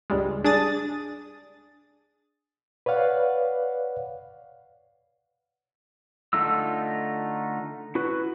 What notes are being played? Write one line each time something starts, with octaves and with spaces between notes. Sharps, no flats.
C#2 G2 G3 G#3
D4 G#4 D#6 A6
B4 C#5 D5 F5 F#5
D3 A3 D#4 F4 E6
E4 F#4 B4